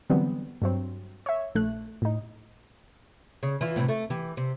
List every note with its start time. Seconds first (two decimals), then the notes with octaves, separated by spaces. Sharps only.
0.10 D3 E3 F#3 G3 B3 C4
0.62 G2 F#3 C4
1.26 C#5 E5
1.55 A#1 A3 F#6
2.02 A2 D#4
3.43 C#3
3.61 E3 F4
3.76 A2 C3 E3
3.89 A3
4.10 E3 G4
4.37 C3